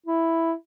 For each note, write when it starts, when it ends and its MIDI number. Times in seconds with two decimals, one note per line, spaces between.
0.06 0.53 64